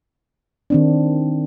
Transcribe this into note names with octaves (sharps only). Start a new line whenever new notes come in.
D#3 C4 D4